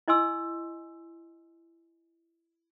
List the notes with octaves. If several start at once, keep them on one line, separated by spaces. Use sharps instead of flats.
E4 D#5 G#5 C6 E6